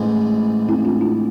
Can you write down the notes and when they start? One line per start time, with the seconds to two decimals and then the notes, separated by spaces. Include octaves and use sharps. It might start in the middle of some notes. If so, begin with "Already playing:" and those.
Already playing: A1 G#2 E3 G#3
0.69 C4 E4
0.79 E4
0.85 D4 F4
1.01 D4 F4